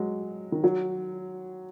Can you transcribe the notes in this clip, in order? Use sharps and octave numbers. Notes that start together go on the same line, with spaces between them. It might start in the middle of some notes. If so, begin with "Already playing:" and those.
Already playing: F#3 G#3
D#3
F#3